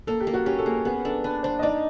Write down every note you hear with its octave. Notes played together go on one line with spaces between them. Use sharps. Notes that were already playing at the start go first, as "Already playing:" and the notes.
A#3 A4
G4
A#3
F#4
C#4 G4
A4
A#3 G#4
B3 G#4
D4 A4
D4 B4
D4 C5
D#5
D#4 D5